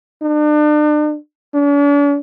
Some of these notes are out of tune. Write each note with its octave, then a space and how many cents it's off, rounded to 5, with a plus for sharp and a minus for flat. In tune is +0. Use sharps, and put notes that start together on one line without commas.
D4 +40
D4 -45